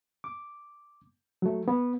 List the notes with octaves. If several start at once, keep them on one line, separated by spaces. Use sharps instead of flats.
D6
F#3 A3
B3